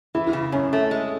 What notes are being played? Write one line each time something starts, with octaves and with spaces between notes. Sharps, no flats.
E3 E4
E4
C#3
F#2 C#4
A3
G#3